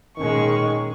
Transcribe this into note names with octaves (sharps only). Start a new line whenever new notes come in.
A#2 D#3 G#3 C#4 C#6